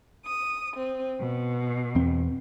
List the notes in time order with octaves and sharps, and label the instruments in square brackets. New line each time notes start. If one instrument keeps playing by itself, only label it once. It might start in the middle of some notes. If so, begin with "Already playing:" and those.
[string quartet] D#6
C4
B2
[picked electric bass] E2 C4